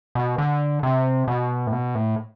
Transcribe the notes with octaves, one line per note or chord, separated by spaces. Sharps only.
B2
D3
C3
B2
A2
B2
A2